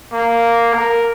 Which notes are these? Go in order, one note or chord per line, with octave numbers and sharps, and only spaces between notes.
A#3
A#4